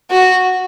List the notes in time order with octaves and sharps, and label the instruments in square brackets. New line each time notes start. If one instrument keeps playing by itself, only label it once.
[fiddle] F#4